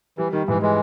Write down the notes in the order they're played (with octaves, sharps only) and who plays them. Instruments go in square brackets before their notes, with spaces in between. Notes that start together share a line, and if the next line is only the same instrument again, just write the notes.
[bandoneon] E3 [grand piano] G3
[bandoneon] D#3 [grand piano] G3
[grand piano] G#2 [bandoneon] E3
[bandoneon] E3 G#3